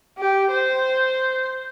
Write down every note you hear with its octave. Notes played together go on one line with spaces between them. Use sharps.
G4
C5